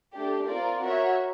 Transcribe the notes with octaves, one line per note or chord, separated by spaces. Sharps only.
A3 D4 G4
C4 F4 A#4 D5
F#4 A#4 C#5 E5